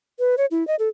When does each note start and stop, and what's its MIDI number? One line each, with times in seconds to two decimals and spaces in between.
0.19 0.35 71
0.38 0.46 73
0.51 0.66 64
0.67 0.76 75
0.79 0.89 69